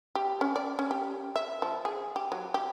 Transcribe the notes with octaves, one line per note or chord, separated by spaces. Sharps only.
G4
C#4
D5
C#4
G4
E5
F3
G#4
G4
F#3
G4